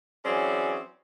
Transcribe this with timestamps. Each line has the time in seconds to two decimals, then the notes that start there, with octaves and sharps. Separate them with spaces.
0.25 E3 F#3 C4 C#4 G#4 D5